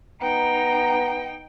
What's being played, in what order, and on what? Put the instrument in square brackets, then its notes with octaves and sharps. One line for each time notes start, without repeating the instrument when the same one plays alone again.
[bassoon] B3 [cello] D#4 G5 [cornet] A#5